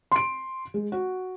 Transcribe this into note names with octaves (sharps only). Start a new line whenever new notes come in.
C6 D7
G#3
F#4